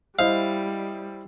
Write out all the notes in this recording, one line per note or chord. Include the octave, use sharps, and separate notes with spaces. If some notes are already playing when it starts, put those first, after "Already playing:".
G3 E4 C5 D#5 F5